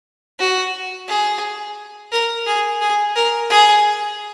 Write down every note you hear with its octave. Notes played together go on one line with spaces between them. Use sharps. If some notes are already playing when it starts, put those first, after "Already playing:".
F#4
G#4
A#4
G#4
G#4
A#4
G#4